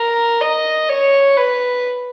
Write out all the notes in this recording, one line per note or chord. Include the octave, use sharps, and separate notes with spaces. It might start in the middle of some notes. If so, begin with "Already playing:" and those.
Already playing: A#4
D#5
C#5
B4